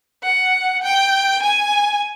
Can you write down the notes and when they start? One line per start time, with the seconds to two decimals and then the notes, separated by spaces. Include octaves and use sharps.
0.23 F#5
0.83 G5
1.42 G#5